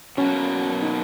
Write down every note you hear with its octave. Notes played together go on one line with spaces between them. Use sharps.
B2 F#3 A#3 C#4
D#4